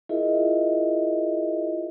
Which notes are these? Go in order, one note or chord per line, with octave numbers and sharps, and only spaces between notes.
E4 F4 G#4 A#4 D#5 E5